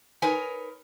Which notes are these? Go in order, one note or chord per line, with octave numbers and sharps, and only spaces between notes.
D#4 A#4 B4 C#5 G#5